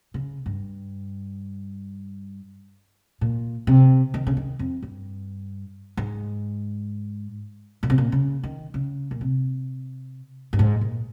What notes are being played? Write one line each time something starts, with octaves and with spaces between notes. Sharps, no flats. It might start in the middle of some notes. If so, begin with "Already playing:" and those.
C#3
G2
A#2
C3
D#3
C#3
D#3
F2
G2
G#2
A#2
C3
A#2
C#3
D#3
C#3
A#2
C3
G2
G#2
A#2